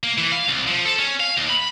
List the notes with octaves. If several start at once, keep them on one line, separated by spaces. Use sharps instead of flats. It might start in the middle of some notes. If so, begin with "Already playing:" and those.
A#3
E3
F5
C2
F3
A4
C#4
F5
D#2
B5